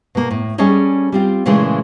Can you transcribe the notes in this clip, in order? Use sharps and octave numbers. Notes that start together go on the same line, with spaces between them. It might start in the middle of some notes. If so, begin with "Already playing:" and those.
B2 A#3
A2
G3 C#4 G#4 A4 C#5 D#5
G3 C4 F4
A#2 C#3 E3 G#3 A3